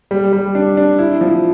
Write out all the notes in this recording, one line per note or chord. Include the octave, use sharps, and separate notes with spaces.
G3
G3
D4
D4
E4
F3